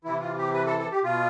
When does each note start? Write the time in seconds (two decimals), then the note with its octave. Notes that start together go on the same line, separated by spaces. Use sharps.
0.04 C3 E3 E4
0.21 F4
0.38 G4
0.54 B4
0.66 A4
0.79 A4
0.91 G4
1.03 B2 F4